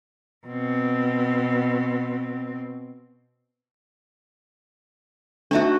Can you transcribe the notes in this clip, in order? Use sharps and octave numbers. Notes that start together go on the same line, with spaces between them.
B2 C4
A3 D4 D#4 F#4 E5